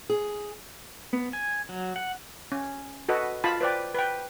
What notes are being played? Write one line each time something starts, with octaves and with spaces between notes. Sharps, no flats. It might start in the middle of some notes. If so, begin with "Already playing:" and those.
G#4
B3
G#5
F#3
F#5
C#4
F#4 A4 B4 D#5
F4 A5 B5
B4 C5 D5 G5
B4 G5